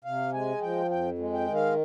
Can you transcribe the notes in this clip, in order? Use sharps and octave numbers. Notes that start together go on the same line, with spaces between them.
C3 F5
G#3 G#5
F3 G5
F2 G5
G#3
G5
D#3
F5